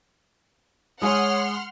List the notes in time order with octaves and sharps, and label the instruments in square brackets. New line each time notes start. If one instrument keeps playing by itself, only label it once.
[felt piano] G#3 G#5 [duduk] C#5 [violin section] F#5 C6 F6 [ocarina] D#6